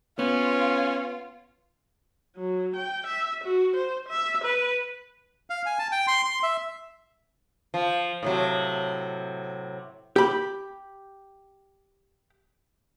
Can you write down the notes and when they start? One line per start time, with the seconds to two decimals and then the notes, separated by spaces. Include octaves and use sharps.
0.19 B3 C#4 F4
2.36 F#3
2.76 G5
3.06 E5
3.44 F#4
3.76 C5
4.08 E5
4.44 B4
5.50 F5
5.66 G#5
5.79 A5
5.92 G5
6.07 C6
6.25 C6
6.43 E5
7.74 F3
8.23 A2 C3 F#3
10.16 G4 B5